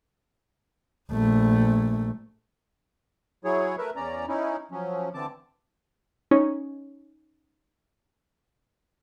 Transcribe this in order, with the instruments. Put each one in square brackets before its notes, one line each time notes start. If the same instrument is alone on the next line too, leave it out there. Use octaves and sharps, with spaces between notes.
[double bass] A#1 A3
[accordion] F#3 E4 G#4 C#5
A3 A#4 B4 E5
E2 C#4 D5 A#5
C#4 D#4 E4
F3 F#3 C#4
D3 E3 C4 A5 D6
[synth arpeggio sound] C#4 D#4 C#5